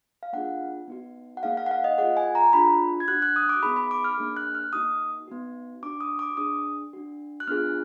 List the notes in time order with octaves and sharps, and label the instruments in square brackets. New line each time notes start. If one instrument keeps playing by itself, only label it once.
[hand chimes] F5
A#3 D4 F4 G#4 F#5
B3 D#4 F#4
F#5
A#3 D#4 G#4 F5
F5
F#5
F5
D#5
A#3 F4 G#4 F#5
G#5
A#5
D4 F4 G#4 B5
G#6
D4 F#4 F#6
F#6
D#6
D6
B3 D#4 G#4 B5
B5
D6
F6
A#3 D4 G#4
F#6
F6
A#3 D#4 F#4 D#6
B3 D#4 F#4
D4 F#4 D6
D#6
D6
D4 G#4 D#6
D4 F#4
F#6
B3 D4 F4 G#4 F6